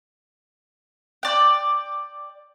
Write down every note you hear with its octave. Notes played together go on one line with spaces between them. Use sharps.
D5 G5